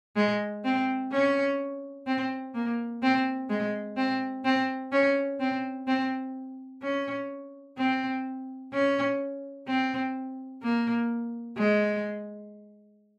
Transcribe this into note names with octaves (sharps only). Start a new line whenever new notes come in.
G#3
C4
C#4
C4
A#3
C4
G#3
C4
C4
C#4
C4
C4
C#4
C4
C#4
C4
A#3
G#3